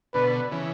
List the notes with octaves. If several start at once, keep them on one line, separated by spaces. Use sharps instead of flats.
B2 D3 B4
C#3 E3